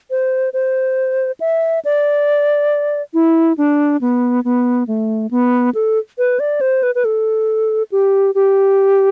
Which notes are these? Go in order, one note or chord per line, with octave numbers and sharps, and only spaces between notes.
C5
C5
E5
D5
E4
D4
B3
B3
A3
B3
A4
B4
D5
C5
B4
B4
A4
G4
G4